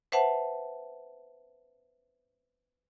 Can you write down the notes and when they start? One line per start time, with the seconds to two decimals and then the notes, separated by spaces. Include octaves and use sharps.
0.12 B4 C5 E5 F#5 A5